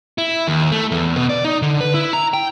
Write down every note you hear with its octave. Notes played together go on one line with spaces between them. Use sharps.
E4
D#2
A3
E2
B2
D5
D#4
D3
B4
E4
A#5
G5